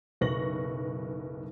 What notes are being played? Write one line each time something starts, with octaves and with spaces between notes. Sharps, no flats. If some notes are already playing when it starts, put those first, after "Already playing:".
F#1 B1 B4 C#6 A#6 F#7